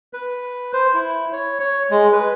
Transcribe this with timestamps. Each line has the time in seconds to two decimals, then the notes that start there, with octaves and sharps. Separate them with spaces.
0.13 B4
0.73 C5
0.94 E4
1.33 C#5
1.60 C#5
1.91 G#3
2.12 B4